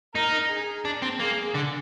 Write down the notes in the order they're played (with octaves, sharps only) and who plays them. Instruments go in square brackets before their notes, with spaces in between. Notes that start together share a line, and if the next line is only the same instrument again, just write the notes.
[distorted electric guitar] D#4 [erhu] A#4
[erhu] G#4
[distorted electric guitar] D4
C4
[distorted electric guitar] A#3 [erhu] G#4
[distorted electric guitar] D3